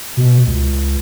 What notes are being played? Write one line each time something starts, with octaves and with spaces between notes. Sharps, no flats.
B2
C#2